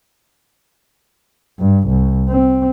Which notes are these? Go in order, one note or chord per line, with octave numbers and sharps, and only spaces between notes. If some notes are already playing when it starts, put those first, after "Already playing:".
G2
C2
C4